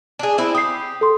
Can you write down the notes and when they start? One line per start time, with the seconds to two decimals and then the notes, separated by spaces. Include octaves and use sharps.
0.19 D4 G#4
0.38 C4 E4
0.55 G4 D#6 C7
1.01 A4 C6